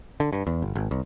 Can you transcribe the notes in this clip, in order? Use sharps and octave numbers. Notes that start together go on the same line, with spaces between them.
D3
G2
E2
G1
G#1
C2